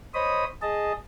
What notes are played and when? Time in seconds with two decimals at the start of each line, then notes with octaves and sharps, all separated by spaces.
0.14 C5 C#5 D#5 B5 D#6
0.62 G#4 D#5 A5